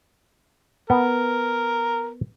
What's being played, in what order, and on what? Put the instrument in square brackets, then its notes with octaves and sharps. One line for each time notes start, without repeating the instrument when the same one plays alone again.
[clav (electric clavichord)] B3 [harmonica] A#4